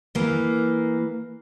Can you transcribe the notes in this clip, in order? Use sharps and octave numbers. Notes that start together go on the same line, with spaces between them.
E3 A#3